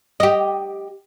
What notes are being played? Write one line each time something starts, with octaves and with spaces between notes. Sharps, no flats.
G4 D#5